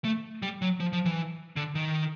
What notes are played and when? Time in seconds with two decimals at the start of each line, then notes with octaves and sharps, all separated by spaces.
0.04 A3
0.42 G3
0.62 F#3
0.80 F3
0.93 F3
1.05 E3
1.56 D3
1.75 D#3